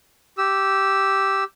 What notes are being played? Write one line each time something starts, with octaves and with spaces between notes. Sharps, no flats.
G4 E6